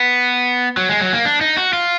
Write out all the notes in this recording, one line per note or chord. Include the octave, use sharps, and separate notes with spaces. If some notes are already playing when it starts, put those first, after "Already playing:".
Already playing: B3
F#3
G#3
F#3
A#3
D4
D#4
F#4
F4